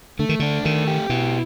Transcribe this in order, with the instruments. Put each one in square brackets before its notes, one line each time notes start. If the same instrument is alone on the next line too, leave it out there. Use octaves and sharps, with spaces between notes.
[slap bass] D3 [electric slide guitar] A3
[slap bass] D#3
[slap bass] D3 [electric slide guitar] D4
[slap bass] D#3 [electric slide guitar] A3
[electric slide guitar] G4
[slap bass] B2 [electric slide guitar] E4